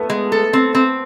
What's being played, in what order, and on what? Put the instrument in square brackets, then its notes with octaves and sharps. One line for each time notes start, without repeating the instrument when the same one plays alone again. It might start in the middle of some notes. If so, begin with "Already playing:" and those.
Already playing: [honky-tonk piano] A3 B3
[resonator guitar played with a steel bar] G#3
A4
C4
C4